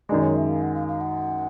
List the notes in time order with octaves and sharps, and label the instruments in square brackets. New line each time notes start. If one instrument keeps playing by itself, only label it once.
[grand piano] F#2 D#3 G#3 [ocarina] D5
[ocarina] C#5
E5
F5
F#5
F5
F5
F#5